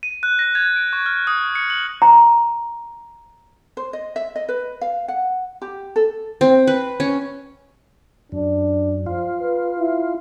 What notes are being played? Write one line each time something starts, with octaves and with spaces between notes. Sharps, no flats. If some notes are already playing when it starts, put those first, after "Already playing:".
D#7
F#6
A#6
G#6
D7
C#6
F6
D#6
C#7
F#7
A#5
C5
D#5
E5
D#5
B4
F5
F#5
G4
A4
C4
B4
C#4
F#2 D4
F3 F4
B4
E4